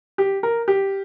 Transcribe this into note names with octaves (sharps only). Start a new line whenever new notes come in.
G4
A#4
G4